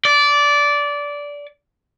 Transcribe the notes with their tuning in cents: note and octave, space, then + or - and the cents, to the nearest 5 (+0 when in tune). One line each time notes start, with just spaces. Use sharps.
D5 -15